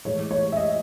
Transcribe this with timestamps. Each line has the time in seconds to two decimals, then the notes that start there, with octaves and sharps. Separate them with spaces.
0.05 A2 E3 G#3 C#5
0.31 C#5
0.52 E5
0.57 D#5